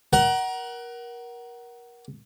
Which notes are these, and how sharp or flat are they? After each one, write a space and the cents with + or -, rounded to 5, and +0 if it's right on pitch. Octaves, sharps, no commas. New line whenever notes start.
A#4 +25 F#5 +20